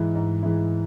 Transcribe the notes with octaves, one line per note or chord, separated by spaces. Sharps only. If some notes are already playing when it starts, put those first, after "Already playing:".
Already playing: G#2 E3 G#3 E4
G#2
E3 G#3 E4